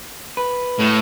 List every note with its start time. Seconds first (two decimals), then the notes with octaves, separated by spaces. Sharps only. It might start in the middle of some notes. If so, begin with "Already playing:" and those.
0.37 B4
0.79 A2